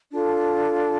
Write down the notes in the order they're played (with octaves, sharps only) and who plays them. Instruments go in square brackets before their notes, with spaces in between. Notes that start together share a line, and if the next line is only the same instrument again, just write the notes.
[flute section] D4 F4 A4